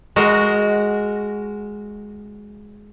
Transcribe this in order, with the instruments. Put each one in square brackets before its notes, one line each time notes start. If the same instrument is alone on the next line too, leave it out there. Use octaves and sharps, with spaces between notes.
[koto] G#3 F#4 A#4